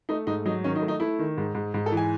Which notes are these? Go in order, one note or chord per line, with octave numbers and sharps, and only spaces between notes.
A3 D#4
G#2 D#4
F#3 D#4
D#3 C#4
D#4
A3
D#4
A3 E4
D#3
G#2
G#2
G#2
A4
E3
G#5